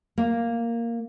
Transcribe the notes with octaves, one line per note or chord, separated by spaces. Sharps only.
A#3